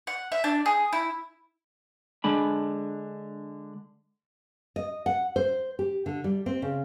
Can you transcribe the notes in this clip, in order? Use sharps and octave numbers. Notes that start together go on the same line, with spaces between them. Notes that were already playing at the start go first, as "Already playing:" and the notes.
F#5
E5
D4
G#4
E4
D3 G#3 D4 B5
D#5
F#5
C5
G4
D3
G3
C4
C#3